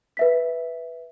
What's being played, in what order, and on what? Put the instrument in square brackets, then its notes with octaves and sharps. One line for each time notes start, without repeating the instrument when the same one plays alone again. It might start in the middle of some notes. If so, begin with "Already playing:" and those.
[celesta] B4 E5 B6